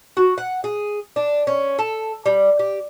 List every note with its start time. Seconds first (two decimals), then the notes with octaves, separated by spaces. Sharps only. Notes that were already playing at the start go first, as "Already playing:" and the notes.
0.17 F#4
0.38 F#5
0.64 G#4
1.16 D4
1.47 C#4
1.79 A4
2.26 G3
2.59 G4